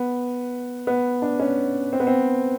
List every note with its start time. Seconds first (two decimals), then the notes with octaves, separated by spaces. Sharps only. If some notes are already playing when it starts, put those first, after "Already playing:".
Already playing: B3
0.87 B3
1.22 D4
1.40 C#4
1.93 C4
2.00 B3
2.07 C4